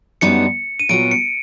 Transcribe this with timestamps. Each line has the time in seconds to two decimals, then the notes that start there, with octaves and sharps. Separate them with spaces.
0.21 F#2 D3 G3 B3 D#4 C#7
0.80 D#7
0.89 A#2 F#3 B3 D7
1.11 C#7